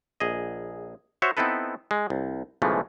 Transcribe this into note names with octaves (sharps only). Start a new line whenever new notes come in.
A#1 G#4 D#5
F#4 C5 C#5 E5
B3 C4 D#4 E4 A4 B4
G#3
C2
B1 C#3 E3 F3 G#3 A3